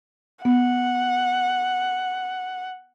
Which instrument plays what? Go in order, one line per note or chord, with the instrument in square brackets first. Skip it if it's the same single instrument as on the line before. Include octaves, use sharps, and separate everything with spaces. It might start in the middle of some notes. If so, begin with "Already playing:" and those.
[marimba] B3 [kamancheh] F#5